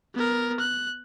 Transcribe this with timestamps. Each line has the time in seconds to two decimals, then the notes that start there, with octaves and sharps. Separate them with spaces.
0.14 B3 A#4
0.60 F#6